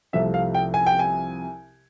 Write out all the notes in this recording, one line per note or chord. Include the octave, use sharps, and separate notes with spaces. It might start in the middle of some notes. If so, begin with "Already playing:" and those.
C2 C3 F3 A3 E5
F5
G5
G#5
G5
G#5